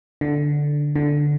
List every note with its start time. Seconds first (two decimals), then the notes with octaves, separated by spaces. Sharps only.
0.21 D3
0.96 D3